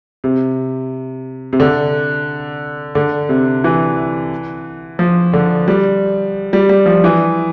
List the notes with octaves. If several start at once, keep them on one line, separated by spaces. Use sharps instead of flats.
C3
C3
D3
D3
C3
E3
F3
D3
G3
G3
G3
F3
E3